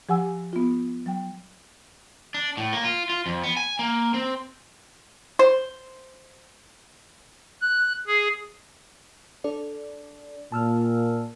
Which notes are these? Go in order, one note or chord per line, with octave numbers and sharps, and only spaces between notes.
F3 G4 F#5 G#5 E6
B3 F4
F#3 G5
D4
A2
A#3
F4
F4
F2
B3
G#5
A#3
C4
C5
F#6
G#4
D4 A4 D5
A#2 A5 E6 F6